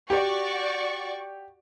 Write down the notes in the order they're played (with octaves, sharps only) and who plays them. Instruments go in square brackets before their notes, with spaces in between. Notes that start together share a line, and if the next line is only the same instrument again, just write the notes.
[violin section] F#4 D5 C#6 [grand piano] G4